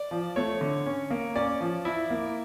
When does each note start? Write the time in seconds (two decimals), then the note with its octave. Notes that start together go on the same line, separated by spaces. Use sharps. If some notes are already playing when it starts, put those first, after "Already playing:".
Already playing: D5
0.11 F3
0.36 A3 C#5
0.61 D3
0.86 C#4
1.11 A#3
1.35 C#4 D5
1.61 F3
1.85 E4
2.10 A#3